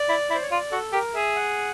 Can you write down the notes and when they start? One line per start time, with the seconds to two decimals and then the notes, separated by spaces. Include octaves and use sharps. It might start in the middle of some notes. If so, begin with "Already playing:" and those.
Already playing: D5
0.09 E4
0.30 E4
0.35 C5
0.42 C#5
0.51 F4 D5
0.71 F#4 A4
0.92 G4 A#4
1.14 G#4 E5
1.35 F#5